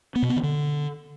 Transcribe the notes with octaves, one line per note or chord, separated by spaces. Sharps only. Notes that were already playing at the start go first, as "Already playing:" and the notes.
B3
B2
B3
D#3
D3